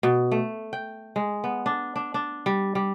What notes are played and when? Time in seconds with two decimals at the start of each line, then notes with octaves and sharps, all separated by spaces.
0.03 B2
0.32 A3
0.73 G5
1.16 G#3
1.44 B3
1.66 D4
1.96 D4
2.14 D4
2.46 G3
2.75 G3